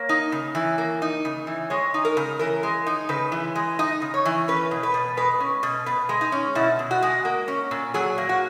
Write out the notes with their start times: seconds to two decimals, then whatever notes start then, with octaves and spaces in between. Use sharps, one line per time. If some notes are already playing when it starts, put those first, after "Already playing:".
Already playing: A#3 C#5
0.09 D#4
0.32 C#3
0.55 E3
0.78 A#3
1.02 D#4
1.25 C#3
1.47 E3
1.70 G#3 C#5
1.94 D#4
2.05 A#4
2.17 C#3
2.39 E3 A#4
2.63 G#3
2.86 D#4
3.09 C#3 B4
3.32 E3
3.55 G#3
3.79 D#4 D#5
4.02 C#3
4.14 C#5
4.25 E3
4.48 C#4 B4
4.71 B2
4.83 B4
4.94 B2
5.17 G#3 B4
5.40 C#4
5.63 B2
5.86 B2 B4
6.09 G#3
6.21 D#4
6.32 C#4
6.55 B2 E4
6.79 B2
6.91 F#4
7.02 G#3
7.25 A#3
7.48 C#4
7.71 A#2
7.94 F#3 G#4
8.18 A#3
8.29 F#4